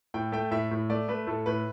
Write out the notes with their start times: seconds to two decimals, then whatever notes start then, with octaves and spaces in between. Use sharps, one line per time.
0.14 A2 G5
0.32 A3 G5
0.51 A2 E5
0.71 A2
0.90 A3 D5
1.08 A3 B4
1.27 A2 A4
1.46 A2 B4